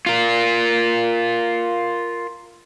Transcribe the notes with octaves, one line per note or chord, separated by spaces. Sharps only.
F4 A#4